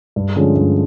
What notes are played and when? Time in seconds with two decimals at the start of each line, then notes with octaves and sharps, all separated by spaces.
0.16 G2
0.36 D3 F3 G#3 C#4
0.56 G2